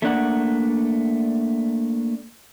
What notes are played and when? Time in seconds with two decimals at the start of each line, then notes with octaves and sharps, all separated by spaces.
0.02 A3 A#3 D4 F#5